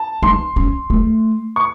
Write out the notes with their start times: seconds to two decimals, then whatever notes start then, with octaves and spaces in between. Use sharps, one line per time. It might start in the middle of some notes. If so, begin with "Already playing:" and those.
Already playing: A5
0.22 D#4 C6
0.56 C#4
0.90 A3
1.56 C#6